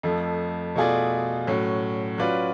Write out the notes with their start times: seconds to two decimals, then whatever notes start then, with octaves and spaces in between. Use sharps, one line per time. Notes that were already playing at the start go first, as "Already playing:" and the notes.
0.03 F2 F3 A3
0.76 B2 A3 F4 G#4 D5
1.47 A2 F#3 C#4
2.18 F#3 C#4 F4 B4 D5